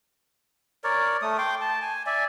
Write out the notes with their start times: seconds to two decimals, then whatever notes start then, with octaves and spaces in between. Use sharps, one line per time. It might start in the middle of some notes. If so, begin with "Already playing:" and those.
0.84 A#4 C#5 D5
1.22 A3 D#6
1.38 G5 C6 D6
1.61 A5
1.82 G#5
2.06 D5 E5 G#5